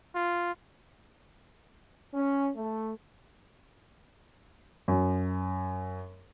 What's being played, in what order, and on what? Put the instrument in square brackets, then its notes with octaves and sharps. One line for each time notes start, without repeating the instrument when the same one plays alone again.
[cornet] F4
[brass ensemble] C#4
A3
[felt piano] F#2